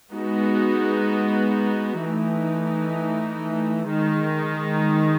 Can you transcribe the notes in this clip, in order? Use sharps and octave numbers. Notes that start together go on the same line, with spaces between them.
G#3 B3 D#4 F#4
E3 A3 D#4
D#3 G#3 D#4